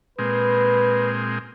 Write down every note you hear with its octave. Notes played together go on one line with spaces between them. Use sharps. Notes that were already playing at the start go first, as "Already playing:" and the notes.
A#2 G#3 C4 B4